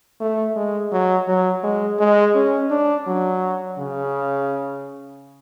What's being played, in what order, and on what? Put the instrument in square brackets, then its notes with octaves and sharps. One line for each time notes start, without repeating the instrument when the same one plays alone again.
[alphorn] A3
G#3
F#3
F#3
G#3
G#3
C#4
D4
F#3
C#3